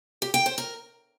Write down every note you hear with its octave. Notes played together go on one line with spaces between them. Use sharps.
G4
G5
C5
A#4